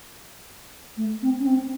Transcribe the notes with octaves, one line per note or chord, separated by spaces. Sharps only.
A3
C4
C#4
C4